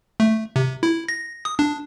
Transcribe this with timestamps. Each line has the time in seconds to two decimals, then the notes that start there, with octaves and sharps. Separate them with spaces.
0.20 A3
0.56 C3
0.83 E4
1.08 A#6
1.45 D#6
1.59 D4